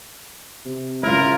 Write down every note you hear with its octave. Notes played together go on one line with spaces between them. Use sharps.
C3
C#2 E4 F4 A#4